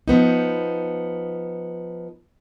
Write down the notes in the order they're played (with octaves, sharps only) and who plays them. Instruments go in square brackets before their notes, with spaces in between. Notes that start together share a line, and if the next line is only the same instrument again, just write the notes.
[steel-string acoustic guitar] F3 B3 D#4